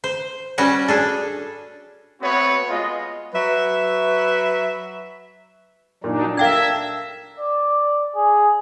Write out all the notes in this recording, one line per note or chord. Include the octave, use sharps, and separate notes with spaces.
C5
G3 C#4 F#4 F#5
D4 G#4 A4
A3 B3 C4 F#4 B4 C#5
G#3 B3 F4 D#5
F#3 B4 E5
A#2 F#3 D4 D#4
D4 A#4 E5 F5 G5 G#6
D5
G#4